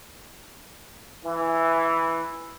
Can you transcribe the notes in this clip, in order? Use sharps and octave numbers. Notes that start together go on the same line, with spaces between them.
E3